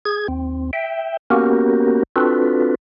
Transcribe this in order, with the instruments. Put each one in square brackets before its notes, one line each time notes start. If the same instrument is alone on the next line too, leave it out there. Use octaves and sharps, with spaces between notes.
[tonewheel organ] G#4 G#6
D#2 C4
E5 G5
A#3 B3 C#4 F#4 G4 A#4
C4 D4 F4 F#4 A4 B4